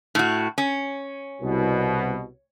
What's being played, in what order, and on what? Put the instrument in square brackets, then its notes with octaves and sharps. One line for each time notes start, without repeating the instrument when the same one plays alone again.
[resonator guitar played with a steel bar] A2 F#4
C#4
[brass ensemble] C2 B2